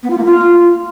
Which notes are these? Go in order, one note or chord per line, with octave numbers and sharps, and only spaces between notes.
B3
F4
A#3
F4